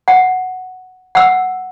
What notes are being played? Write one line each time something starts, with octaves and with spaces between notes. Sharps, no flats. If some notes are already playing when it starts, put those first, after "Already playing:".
F#5
F#5 E6